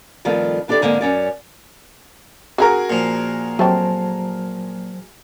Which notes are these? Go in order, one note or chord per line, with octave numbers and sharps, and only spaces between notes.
G2 D#3 F3 A3 C4 F4
E3 D4 G4 A4 D5
G#2 D3 G#3 A#3 C4
F#2 C#4 D5
C#3 F4 F#4 G#4 A#4 A#5
A#2 F3
F#3 A3 C4 G4 C5 A5